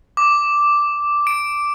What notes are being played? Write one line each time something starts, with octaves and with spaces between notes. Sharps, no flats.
D6
D7